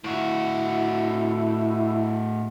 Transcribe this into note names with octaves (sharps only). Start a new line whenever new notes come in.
A2 E4 F#4